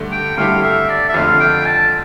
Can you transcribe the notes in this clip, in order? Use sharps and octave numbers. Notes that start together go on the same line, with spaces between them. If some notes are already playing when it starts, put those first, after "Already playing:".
Already playing: G2 D3 A3
G5
G2 D3 A3 E4 G4 F5
E5
D5
E5
F2 D3 A3 F5
G5
A5